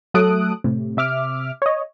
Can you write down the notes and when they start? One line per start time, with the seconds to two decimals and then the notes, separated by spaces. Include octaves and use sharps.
0.14 F#3 A3 A4 D#6 F#6 D7
0.64 A2 C3
0.97 C3 E5 D6 F6
1.62 C#5 D#5